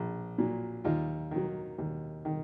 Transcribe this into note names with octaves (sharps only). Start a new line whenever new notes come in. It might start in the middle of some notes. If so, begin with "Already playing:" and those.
Already playing: A#1
A#2 F#3
D#2 D#4 F4
D#3 F#3
D#2
D#3